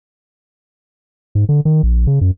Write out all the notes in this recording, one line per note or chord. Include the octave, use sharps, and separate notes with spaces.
G#2
D3
D#3
A#1
C#3
F#2